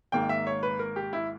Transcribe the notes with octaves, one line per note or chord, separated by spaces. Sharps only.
G#1 G#2 D#3 A#3 G5
E5
C#5
B4
A#4
G4
E4